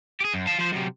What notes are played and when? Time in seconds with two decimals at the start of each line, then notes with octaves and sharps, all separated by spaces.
0.20 G4 G#4
0.34 F#2
0.47 F5 A5
0.59 F3 C5
0.73 F#2 C3